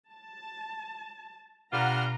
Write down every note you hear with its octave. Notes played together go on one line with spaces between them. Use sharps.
A5
B2 G3 D4 F4 F#5 A#5 F6